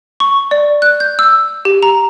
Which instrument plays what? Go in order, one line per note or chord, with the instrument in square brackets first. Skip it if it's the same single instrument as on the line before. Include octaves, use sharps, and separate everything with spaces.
[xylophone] C#6
D5
F#6
G6
E6
G4
A#5